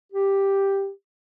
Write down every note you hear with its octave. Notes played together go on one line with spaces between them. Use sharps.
G4